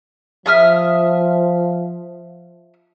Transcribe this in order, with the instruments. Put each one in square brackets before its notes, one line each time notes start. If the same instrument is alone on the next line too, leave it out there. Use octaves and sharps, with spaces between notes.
[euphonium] F3 [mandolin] E5 D#6 F6